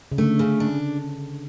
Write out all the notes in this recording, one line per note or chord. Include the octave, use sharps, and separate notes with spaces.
C#3
D3 A3
C#3
D4